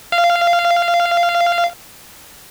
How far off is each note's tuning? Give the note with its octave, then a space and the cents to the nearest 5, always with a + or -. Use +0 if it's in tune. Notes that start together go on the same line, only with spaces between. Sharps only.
F5 -15